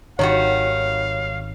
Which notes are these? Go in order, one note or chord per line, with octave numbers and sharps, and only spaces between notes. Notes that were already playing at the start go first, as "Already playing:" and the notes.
G#1 D#3 G3 F#4 C#5 F5